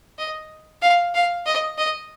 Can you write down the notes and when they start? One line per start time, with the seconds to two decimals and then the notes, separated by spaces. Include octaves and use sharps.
0.18 D#5
0.82 F5
1.15 F5
1.46 D#5
1.78 D#5